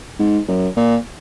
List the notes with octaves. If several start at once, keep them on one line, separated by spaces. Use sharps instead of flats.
G#2
F#2
A#2